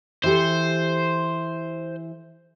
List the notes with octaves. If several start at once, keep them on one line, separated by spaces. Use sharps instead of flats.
E3 G4 A4 C5